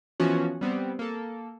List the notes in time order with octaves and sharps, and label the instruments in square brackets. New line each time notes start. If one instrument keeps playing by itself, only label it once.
[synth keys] E3 F3 B3 C#4 F#4
G3 B3 C4
A#3 A4